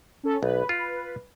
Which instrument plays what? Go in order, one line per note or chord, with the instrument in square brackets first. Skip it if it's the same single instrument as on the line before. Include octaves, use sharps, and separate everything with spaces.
[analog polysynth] C#4 A4
[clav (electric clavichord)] B1 [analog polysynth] B4
[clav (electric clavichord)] F4